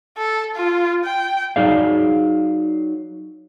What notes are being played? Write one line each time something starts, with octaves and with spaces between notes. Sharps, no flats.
A4
F4
G5
F#3 D#4 G#4 D5 F5